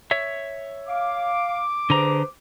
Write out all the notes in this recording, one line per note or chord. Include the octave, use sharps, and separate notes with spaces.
C#5 E5
F5 D6
D3 G#4 B4 C5 A#5